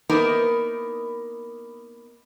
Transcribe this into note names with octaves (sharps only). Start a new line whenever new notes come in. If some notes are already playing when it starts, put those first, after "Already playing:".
A#3 B3 D#4 E4 A#4 B4